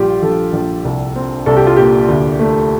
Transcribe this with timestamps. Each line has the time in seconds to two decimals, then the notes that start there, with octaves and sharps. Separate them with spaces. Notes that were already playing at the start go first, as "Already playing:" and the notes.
Already playing: A#1 G3 F4 G4
0.23 A#1 A4
0.53 A#1
0.85 C2
1.16 C4
1.46 C2 A4
1.57 G4
1.67 F4
1.76 A#2 G4
2.08 D2
2.39 A3